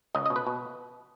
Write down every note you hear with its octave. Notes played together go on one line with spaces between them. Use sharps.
C#2 D#5
D#5
B2
B4
B2